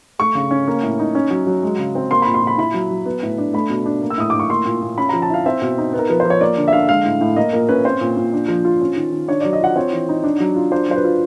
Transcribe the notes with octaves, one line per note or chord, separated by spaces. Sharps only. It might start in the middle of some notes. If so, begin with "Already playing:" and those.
A3 C#6
C#3
C#4
A#3
A2
D#4
C#4
F#3
F#3
G#3
C#3
C4
A#3 C6
B5
A#2
C6
A#2
B5
E4 B5
F#3
F#3
B3
A2
D4
A3 B5
B2
D4
A#3
E6
A2 D#6
A2 D6
C#6
A#3 C6
A#2
A#2
C#4 B5
A#5
F3
A5
E4 F5
C4 E5
B2
D#4
B3
A#4
F3 B4
C5
F3
C#5
A#3 D5
D3
E5
D3 F5
G#3 F5
A2
A2
A#3 D#5
A#2 A#4
C#4 B4
C4 C5
A#2
A#2
D4
F3
F4
C#4
D#3
D#3
D4 C#5
D5
F#3
D#5
F4 F#5
C4 C#5
E3
D#4
D4
F#3
F4
D4 C5
F#3 C5
B4
F4